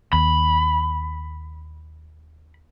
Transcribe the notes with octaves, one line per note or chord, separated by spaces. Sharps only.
D#2 B5